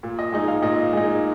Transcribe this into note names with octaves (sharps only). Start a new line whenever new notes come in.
A#2
D#5
G#3 D#4 D#5
F5
A#2 D#5
G#3 D#4